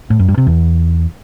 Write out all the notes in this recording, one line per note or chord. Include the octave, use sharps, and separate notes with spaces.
A2
F#2
G2
C3
E2